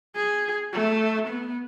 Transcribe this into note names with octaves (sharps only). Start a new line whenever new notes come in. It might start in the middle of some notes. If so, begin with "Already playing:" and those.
G#4
A3
B3